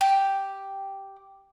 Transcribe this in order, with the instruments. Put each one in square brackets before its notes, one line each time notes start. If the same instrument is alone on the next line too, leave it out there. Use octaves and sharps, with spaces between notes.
[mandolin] G4